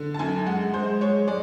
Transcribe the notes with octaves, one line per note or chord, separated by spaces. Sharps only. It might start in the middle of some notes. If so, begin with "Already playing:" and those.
Already playing: D3
A5
F#2 G#5
G#3 F#5
G#3 C5
G#3 C#5
G#3 D5